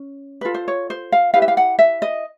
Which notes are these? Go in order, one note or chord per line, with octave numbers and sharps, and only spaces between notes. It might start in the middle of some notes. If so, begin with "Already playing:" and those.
Already playing: C#4
F4 A4 B4
C5
C#5
C5
F5
E4 G4 B4 F5
E5
F5
F#5
E5
D#5